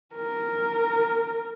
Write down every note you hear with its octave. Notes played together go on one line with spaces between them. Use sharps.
A#4